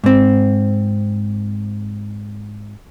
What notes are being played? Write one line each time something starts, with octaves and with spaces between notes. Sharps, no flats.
G#2 C4